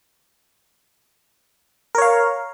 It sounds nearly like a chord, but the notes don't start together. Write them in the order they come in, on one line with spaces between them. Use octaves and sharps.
A#4 C#5 F5